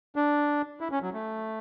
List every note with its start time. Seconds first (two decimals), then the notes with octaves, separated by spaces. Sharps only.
0.16 D4
0.81 E4
0.91 C#4
1.02 F#3
1.14 A3